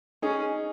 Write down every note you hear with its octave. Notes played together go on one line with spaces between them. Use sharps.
C#4 D#4 G#4